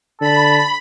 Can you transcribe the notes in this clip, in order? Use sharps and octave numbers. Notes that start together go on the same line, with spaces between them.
D3 A5 B5